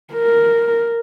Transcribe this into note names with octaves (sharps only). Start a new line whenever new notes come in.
A#4